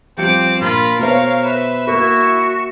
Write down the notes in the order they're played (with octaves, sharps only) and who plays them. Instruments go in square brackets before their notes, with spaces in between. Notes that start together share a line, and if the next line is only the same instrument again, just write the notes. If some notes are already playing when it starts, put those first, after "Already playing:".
[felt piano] F3 G3 C#7 [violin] C4 D6 [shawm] G5
[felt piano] A#1 [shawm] F4 [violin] A#4 B5
[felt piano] B2 C5 [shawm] A#4 [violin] C#5 F5
[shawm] B4 [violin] E5
[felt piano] A#3 A#4 [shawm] E4 [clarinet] F#4